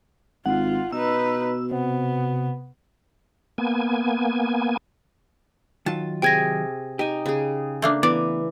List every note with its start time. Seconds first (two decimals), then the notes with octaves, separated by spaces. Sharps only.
0.46 G#1 F4 F#5
0.93 B2 D#4 B4 E6
1.71 C3 B3
3.58 A#3 B3 G#5
5.86 D#3 F#3 F4 A5
6.22 C3 G#4 G5 G#5 G#6 A#6
6.99 D#4 G4 G#5
7.26 C#3 G#4
7.82 A3 A#3 D4
8.03 E3 B3 D5 D6